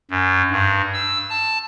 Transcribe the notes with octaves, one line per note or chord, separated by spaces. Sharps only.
F#2
G2
E6
A5